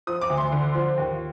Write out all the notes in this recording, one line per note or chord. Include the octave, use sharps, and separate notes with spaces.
F3 D#6
D6
D2
C6
D3
F3
D#2